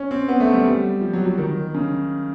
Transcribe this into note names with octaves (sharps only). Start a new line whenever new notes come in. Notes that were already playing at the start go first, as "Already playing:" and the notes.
Already playing: C#4
C4
B3
A3
G3
G3
F3
F#3
F#3
D#3
C#3